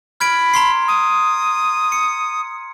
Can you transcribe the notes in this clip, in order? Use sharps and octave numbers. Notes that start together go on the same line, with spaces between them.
B5 F6 G#6 D7
A#5 C6 C7
D#6
C#7